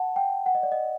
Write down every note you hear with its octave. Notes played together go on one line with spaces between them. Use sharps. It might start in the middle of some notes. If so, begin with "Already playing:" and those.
Already playing: F#5 A5
G5
F#5
D#5
D5
D#5